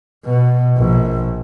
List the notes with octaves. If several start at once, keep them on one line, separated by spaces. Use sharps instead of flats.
B2
A#1